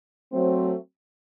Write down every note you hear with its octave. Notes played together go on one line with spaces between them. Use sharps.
F#3 A3 C4